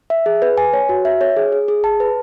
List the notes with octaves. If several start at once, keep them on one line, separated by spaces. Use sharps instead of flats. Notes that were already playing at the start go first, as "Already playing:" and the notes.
E5
G#4
B4
G#5
C#5
F#4
E5
C#5
G#4
G#4
G#4
A5
B4